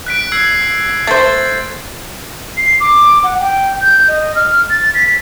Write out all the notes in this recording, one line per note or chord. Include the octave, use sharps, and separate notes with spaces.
F#6 B6 D7
E6 G#6 C7
A3 C5 A6
C7
D6
F#5
G5
G6
D#5
F6
A6
B6